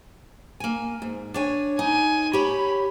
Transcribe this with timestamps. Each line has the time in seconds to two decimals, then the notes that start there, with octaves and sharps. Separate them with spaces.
0.60 A#3 G#5
1.02 G#2
1.34 D4 C#5 G#5
1.79 D#4 G#5
2.33 G4 C#5 B5